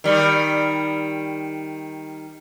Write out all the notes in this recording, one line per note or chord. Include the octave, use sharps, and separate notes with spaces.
D#3 G3